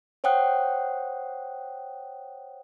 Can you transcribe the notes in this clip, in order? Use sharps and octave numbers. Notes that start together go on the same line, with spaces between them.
C5 C#5 F#5 G5 D#6 F#6